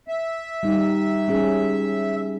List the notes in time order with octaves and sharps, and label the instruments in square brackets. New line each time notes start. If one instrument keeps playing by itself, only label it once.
[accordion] E5
[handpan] G3 D#4
G3 C#4 G#4